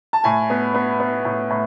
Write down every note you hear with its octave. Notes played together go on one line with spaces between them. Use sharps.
A5
A2 G#5
B3
B3
B3
A2
A2